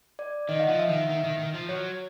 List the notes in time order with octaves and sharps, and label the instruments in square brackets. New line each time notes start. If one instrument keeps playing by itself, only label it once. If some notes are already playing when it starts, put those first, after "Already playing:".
[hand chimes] D5
[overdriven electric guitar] D#3 [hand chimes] D#5
[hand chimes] F5
F#5
[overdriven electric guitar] F3
[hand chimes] E5
[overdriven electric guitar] D#3
[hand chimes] E5
[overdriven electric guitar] D#3
D#3
D#3
F3
[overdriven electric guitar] F#3 [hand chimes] C#5